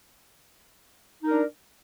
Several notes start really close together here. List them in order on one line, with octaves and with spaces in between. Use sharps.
D#4 A#4 D4